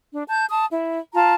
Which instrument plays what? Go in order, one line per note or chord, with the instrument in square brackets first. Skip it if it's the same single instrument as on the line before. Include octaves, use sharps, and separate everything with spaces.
[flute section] D4
A5 G6
A5 D#6
E4
F4 A5 A#5